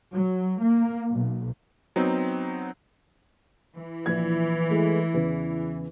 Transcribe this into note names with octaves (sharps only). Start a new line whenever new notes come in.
F#3
A#3
B1
F#3 B3 C4 D#4
E3
A#1 G#6
G#3 A3
E2 C#3